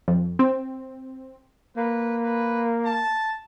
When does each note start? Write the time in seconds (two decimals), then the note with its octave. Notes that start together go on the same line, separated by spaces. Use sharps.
0.08 F2
0.39 C4
1.77 A#3 B4
2.24 B4
2.86 A5